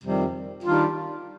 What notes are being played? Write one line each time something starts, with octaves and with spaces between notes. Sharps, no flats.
F2 C3 D#3 G3
D#3 G3 D4 F4